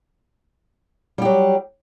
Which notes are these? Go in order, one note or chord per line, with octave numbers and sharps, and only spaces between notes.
F#3 G3 G4